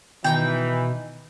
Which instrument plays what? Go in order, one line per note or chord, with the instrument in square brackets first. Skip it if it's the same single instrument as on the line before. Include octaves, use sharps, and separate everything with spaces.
[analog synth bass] B2 [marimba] D#3 [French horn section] E3 [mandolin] D#4 G5